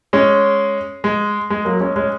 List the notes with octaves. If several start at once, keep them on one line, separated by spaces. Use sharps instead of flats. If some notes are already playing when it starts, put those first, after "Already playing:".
G#3 C#4
G#3
G#3
F#3 A#3
G#3 C#4
G#3 C#4